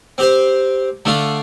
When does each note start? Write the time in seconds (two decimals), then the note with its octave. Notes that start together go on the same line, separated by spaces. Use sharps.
0.18 C4 G4 C5
1.05 D3 A3 D4 F4